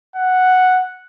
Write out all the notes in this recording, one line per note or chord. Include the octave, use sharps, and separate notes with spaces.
F#5